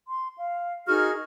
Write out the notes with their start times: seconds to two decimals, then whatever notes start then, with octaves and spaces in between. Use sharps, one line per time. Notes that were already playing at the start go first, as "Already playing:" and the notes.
0.07 C6
0.38 F5
0.88 D#4 F#4 G#4 A#4 D#5 F6